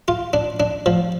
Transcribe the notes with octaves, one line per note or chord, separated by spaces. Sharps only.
F4
D4
D4
F3